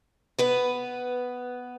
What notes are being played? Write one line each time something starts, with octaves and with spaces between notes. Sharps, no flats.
B3 B4